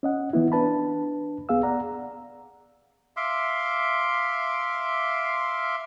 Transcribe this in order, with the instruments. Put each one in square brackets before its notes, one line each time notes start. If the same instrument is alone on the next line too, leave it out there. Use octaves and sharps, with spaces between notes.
[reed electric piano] C#4 D#5 F#5
E3 B3 E4
D4 B4 A5 B5
C2 B3 G#4 F5 E6
D5 F#5 A#5
[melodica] E5 F5 C6 D6